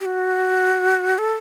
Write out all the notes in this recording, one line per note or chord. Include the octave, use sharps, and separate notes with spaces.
G4
F#4
A4